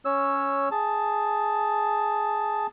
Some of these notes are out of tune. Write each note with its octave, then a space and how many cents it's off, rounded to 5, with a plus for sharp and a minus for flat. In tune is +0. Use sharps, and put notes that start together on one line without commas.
C#4 +0 C#5 +0 E6 +0
G#4 +0 A5 +0